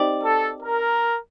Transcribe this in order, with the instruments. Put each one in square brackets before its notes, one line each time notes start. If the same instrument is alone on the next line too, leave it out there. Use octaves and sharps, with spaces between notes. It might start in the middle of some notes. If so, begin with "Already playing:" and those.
Already playing: [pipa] C4 D#4 G4 D5
[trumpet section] A4
A#4